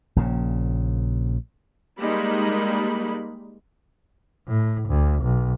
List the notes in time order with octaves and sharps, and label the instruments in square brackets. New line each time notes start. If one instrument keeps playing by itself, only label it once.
[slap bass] A#1 A#2 C#3
[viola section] G3 G#3 A#3 D#4 B5
[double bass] A2
D2
B1